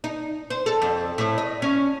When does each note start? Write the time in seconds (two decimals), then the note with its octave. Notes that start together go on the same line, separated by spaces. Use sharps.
0.04 D#4
0.50 C5
0.66 A4
0.82 F2
1.18 A2
1.38 D#5
1.62 C#4